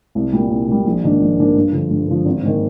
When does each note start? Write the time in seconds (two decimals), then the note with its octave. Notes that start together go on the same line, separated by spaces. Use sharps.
0.15 C2
0.33 A#2 G3
0.50 C2
0.68 A#2 G3
0.85 A#1
1.03 G#2 D#3 A#3 D4
1.20 A#1
1.38 G#2 D#3 A#3 D4
1.56 G2
1.72 D3 F3
1.91 G2
2.08 D3 F3
2.25 G#1
2.43 G#2 D#3 A#3